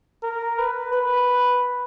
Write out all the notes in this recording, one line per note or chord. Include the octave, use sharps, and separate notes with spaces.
A#4
B4
B4